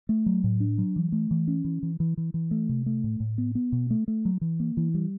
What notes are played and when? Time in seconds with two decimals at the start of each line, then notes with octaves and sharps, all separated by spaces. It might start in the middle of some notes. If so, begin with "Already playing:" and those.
0.09 A3
0.26 F#3
0.44 A2
0.60 D4
0.78 F#3
0.96 E3
1.12 A3
1.31 E3
1.48 C#4
1.65 E3
1.83 E3
2.00 E3
2.17 E3
2.34 E3
2.51 A3
2.69 C3
2.86 A3
3.04 A2
3.20 A2
3.38 B3
3.55 B3
3.72 B2
3.90 A3
4.08 A3
4.25 F#3
4.41 E3
4.60 A#3
4.77 E3
4.94 G3